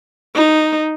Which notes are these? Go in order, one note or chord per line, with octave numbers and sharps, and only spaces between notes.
D#4